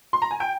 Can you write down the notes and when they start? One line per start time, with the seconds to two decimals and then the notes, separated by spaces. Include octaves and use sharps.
0.13 C6
0.22 A#5
0.31 G#5
0.40 G5